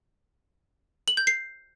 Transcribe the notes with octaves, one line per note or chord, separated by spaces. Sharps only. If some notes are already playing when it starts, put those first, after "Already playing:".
F#7
G6
C7